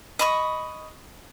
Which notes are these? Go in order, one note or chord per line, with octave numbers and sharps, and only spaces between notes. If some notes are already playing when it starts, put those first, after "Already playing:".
D#5 B5 C#6